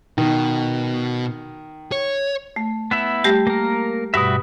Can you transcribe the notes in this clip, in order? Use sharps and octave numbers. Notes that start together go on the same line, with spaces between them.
B2 D#3
C#5
A3
B3 E4 E5
G3 A3 G4
A#3 A#4
G2 B2 G3 F#4 E5